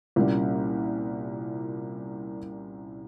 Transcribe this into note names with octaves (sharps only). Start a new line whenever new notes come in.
C2 A#2 G3 A#3 C#4